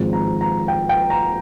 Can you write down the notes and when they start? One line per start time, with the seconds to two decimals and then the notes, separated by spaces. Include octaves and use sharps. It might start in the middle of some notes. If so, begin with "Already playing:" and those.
Already playing: G#1 G#2 F3 G#3
0.13 A#5
0.41 A#5
0.68 G5
0.89 G5
1.10 A#5